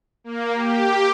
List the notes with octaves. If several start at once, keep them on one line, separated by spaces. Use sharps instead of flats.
A#3
G4